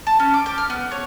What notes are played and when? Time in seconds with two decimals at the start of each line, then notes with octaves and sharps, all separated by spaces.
0.07 A5
0.20 C#4
0.34 D6
0.46 G5
0.58 F6
0.70 B3
0.92 C#5